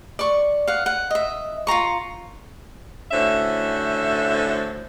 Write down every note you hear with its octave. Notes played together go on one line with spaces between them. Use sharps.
D5 C#6
F5 F#5
F#5
D#5 E5
F4 F#4 A#5 C#6
A2 D3 C#4 F#4 C5 E5